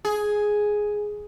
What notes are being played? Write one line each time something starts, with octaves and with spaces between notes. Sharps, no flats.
G#4